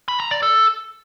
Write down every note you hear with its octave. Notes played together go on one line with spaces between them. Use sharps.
B5
A#5
D5
A4